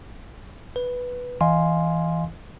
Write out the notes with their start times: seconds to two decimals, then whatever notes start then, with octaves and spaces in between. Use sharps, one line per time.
0.76 B4
1.41 E3 D#5 F5 G#5 C6